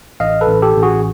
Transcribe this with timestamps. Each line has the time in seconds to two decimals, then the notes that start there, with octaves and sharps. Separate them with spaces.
0.20 A1 D#5 F5
0.41 A4 B4
0.48 A1
0.62 G4 A4
0.76 A1
0.83 F#4 G#4